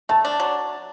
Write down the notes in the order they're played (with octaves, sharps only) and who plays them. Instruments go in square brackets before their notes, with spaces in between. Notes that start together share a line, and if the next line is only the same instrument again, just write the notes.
[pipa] A3 [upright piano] A5
[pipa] D4
F#3